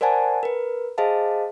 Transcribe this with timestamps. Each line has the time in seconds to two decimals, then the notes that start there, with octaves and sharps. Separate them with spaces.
0.01 A#4 C5 D5 F#5 G#5 A5
0.43 A#4 B4
0.98 G#4 C5 D#5 F5 A5